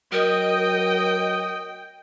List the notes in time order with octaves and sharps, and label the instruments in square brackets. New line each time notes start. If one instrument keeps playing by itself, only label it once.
[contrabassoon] F#3 [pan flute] A#4 [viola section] D#5 [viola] G5